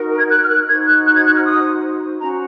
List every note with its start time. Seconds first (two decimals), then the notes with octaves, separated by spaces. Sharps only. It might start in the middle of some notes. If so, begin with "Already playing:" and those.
Already playing: D#4 F#4 A#4
0.16 G#6
0.29 F#6
0.41 F6
0.48 F#6
0.67 D#4 F#4 C5 G#6
0.86 F#6
1.06 F#6
1.15 G#6
1.24 F#6
1.34 F6
1.43 D#6
2.20 C#4 F#4 C5 A#5